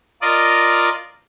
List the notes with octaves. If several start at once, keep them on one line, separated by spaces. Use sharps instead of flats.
F4 A#4 D5 D#5